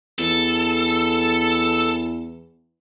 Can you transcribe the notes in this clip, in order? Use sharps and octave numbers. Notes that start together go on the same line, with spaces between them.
E2 A4